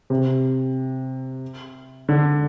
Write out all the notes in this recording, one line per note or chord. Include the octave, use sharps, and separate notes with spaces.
C3
D3